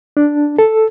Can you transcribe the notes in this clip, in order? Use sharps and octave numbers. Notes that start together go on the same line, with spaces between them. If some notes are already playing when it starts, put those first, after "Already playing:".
D4
A4